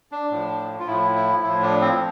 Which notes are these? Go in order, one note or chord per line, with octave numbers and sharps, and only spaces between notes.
D4
A2 F3
F4
A2 F3 E4
E4
A2 F3 E4
D4
C4